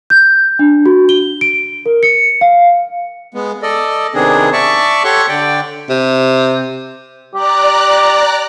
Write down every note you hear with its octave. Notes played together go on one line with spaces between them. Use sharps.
G6
D4
F#4
G7
D7
A#4
C#7
F5
G#3 B3
A4 D5 D#5
C3 D#3 B3 C4 D4 G#4
D5 E5 A5 C#6
G4 A4 C#5 F#5 C6 C#6
D3 D5 G5
C3
G4 D5 A#5 F#6